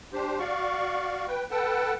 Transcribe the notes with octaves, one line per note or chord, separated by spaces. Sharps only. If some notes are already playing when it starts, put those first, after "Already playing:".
D4 G4 C5
F#4 D5 F5 C#6
B4 G5
A4 B4 F#5 G5 A5